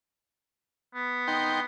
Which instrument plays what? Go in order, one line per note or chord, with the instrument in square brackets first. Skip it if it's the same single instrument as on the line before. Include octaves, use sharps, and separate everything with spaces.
[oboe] B3
[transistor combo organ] D#4 G5 C6